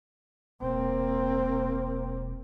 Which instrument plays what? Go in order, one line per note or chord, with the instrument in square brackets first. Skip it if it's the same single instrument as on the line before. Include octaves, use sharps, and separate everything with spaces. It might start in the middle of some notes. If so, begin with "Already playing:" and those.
[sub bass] E1 [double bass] A#3 C4